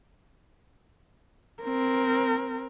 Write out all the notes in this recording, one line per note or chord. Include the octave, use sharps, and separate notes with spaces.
C4 A#4